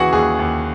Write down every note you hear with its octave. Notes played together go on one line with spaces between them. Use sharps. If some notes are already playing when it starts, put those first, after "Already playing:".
Already playing: D#2 C#3 E3 F#4 G#4 F#5
D#2 G#4
D#2